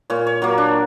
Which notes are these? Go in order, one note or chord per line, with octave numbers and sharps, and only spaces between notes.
A#2 C#5
C#5
F#3 A#3 C#5
D4